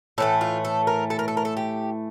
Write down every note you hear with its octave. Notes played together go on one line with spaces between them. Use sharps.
A2 E3 A3 A4
F4
A4
A#4
A4
A#4
A4
A#4
A4
G4